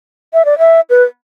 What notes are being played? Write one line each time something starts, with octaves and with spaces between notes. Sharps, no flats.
E5
D5
E5
B4